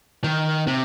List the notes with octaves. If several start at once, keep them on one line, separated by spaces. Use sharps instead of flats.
D#3
C3